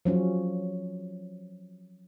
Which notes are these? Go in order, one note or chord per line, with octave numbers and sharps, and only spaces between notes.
F3 F#3 C#4